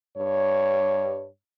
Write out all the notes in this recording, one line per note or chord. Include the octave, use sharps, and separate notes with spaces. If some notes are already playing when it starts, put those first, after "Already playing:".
G2 C#5